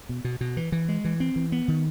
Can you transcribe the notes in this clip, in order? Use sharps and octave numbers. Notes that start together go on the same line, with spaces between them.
B2
B2
B2
E3
E3
G#3
E3
C4
E3
B3
D#3